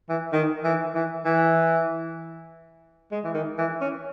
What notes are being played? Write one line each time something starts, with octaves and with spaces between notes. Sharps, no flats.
E3
D#3
E3
E3
E3
G#3
E3
D#3
E3
C#4